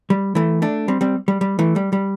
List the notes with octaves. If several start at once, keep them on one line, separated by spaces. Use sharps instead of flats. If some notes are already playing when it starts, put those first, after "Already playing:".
G3
E3 A3
A3 D4
G3 C4
G3 C4
G3
G3
E3 A3
G3
G3